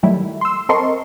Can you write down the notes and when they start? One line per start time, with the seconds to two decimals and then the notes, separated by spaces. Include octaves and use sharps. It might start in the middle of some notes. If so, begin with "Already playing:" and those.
0.03 D#3 F#3 G3 A3 E4
0.41 C6 E6
0.69 C4 A4 A#4 D#5 C6 C#6